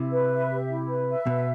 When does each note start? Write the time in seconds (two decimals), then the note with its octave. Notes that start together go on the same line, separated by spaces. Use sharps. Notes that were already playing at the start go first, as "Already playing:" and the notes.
Already playing: C3 E4
0.11 B4
0.31 E5
0.49 G4
0.68 E4
0.89 B4
1.08 E5
1.27 B2 B4